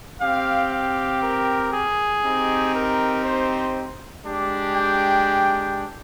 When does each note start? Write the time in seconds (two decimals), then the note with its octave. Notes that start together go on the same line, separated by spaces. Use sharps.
0.21 C4 G4 F5
0.71 F5
1.22 A#4
1.72 G#4
2.23 C4 D#4 G4
2.73 A#4
3.23 C5
4.24 G#3 D4 G4
4.74 G5